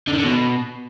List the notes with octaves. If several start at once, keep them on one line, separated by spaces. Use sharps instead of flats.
D3
D#3
D3
B2